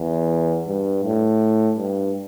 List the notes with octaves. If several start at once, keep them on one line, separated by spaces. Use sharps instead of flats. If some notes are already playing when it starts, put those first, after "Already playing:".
Already playing: E2
G2
A2
G2